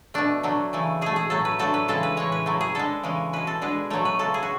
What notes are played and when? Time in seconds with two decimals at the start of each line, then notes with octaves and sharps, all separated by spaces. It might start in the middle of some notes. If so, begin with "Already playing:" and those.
0.14 B2 A3 D4
0.43 D3 F#3 A3
0.73 C#3 E3 A3
1.01 B2 A3 G#4
1.16 G#4
1.30 A2 F#3 A3 A4
1.45 B4
1.59 D3 F#3 A3 A4
1.74 B4
1.88 C#3 E3 G#3 A4
2.03 B4
2.17 A2 E3 G#3 C#5
2.32 B4
2.46 A2 F#3 A3
2.61 G#4
2.75 D3 G#3 A4
3.03 C#3 E3 G#3
3.33 B2 G#3 B4
3.47 A4
3.62 D3 G#3 B4
3.90 B2 F#3 A3 C#5
4.05 B4
4.19 C#3 G#3 A4
4.34 G#4
4.43 F#4